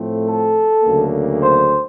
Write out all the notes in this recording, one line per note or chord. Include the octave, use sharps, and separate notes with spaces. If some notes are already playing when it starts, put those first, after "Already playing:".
Already playing: A2 F3 A3 C4
A4
D2 C#3 F#3 A#3
C5